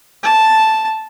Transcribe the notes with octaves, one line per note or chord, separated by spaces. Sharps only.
A5